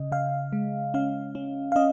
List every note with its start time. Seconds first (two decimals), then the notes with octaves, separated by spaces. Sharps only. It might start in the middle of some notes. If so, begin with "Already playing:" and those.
Already playing: C#3 D#5
0.12 C#3 F5
0.53 G#3
0.94 C#4 F5
1.35 C#4
1.72 F5
1.76 C#4 D#5